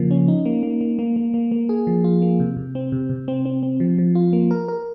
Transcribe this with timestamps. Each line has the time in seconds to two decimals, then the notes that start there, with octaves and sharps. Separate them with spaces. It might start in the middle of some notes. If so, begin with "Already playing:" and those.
Already playing: C#3 F3 A#3
0.11 C#4
0.28 D#4
0.45 A#3
0.63 A#3
0.81 A#3
0.99 A#3
1.16 A#3
1.34 A#3
1.51 A#3
1.69 G#4
1.87 F3
2.04 F4
2.22 A#3
2.40 C3
2.57 C3
2.75 C4
2.92 C3
3.10 C3
3.28 C4
3.45 C4
3.63 C4
3.80 F3
3.98 F3
4.15 F4
4.33 A#3
4.51 A#4
4.68 A#4